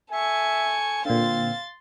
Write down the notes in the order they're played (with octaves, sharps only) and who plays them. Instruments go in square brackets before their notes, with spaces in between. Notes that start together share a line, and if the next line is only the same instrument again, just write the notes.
[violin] A4 C#6 [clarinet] E5 [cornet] G#5
[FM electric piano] A#2 D3 [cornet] C4 [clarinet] F5 [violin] C6 A6